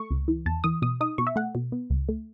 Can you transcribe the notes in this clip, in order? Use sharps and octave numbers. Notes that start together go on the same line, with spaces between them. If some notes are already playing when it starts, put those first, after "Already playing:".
Already playing: A3 C#6
C#2
E3
E2 A5
E3 D#6
B2 D#6
D#4 D#6
B2 C#6
E5
A3 F#5
B2
B3
C#2
A3